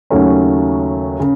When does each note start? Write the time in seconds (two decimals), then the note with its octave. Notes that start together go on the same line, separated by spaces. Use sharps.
0.10 D#2 C#3 F#3 A3 C#4
1.20 C#3